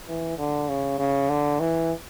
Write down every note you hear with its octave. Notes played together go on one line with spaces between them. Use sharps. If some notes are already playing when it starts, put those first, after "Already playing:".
E3
D3
C#3
C#3
D3
E3